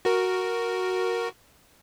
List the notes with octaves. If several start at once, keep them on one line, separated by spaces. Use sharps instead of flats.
F#4 A#4